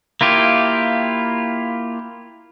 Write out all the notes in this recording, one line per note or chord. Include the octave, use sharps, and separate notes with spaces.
A#3 E4 F4 G4